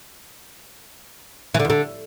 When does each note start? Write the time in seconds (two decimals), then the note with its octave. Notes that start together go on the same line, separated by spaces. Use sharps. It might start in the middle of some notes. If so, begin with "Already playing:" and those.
1.54 E3
1.60 D3
1.65 E2
1.70 D3